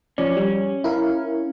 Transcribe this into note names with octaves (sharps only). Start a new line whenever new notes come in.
F3 C#4 D5
G3
E4 A#4 F5